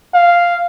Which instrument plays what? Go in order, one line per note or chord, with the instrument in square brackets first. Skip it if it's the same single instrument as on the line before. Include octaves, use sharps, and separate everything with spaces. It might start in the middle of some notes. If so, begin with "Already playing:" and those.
[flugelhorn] F5